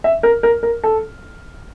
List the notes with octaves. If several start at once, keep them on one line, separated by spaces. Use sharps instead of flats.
E5
A#4
A#4
A#4
A4